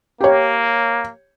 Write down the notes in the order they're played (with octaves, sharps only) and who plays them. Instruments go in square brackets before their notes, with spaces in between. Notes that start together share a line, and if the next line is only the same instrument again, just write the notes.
[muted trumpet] A#3 [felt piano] G4 C#5